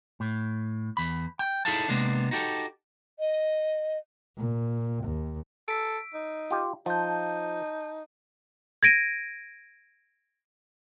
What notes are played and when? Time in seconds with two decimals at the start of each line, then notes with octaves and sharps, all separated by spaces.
0.20 A2
0.97 E2 B5
1.39 G5
1.65 D#4 E4 G#4 A4 F5 A5
1.88 C3 G#3 A#3 B3 D4
2.31 D#4 F#4 G4 A4
3.19 D#5
4.37 A#2
5.04 D#2
5.68 A4 E6 B6 D7
6.14 D#4
6.51 F4 G4
6.86 F3 D#4 A5 G6
8.83 G#6 A#6 D7 D#7